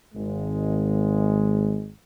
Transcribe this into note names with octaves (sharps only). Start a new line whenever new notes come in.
G#1 G#3